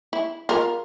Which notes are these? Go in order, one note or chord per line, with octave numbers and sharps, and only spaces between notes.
E4
F4 A#4